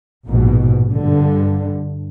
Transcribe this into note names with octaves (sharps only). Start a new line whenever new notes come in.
A#1 G#2 B2
G2 D3